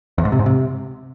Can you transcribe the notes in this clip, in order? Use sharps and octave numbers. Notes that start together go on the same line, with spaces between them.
E2
G#2
C3
G#2
C3